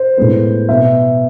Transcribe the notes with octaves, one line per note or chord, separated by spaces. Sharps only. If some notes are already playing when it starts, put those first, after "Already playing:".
Already playing: C5
A2 G#3 B3
B2 B3 E5